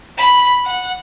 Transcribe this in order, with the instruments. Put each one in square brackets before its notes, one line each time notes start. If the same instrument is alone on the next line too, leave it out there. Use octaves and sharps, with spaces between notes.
[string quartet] B5
F#5